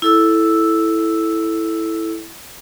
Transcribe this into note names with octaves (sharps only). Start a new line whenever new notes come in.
E4 A4 E6